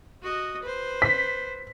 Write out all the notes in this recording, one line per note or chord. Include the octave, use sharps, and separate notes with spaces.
F#4 D#5
B4 C5
B6